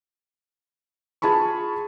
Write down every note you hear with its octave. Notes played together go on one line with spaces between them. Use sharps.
F4 G#4 A5 B5 C#6